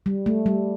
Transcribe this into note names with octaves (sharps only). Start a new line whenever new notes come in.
G3
A3
G3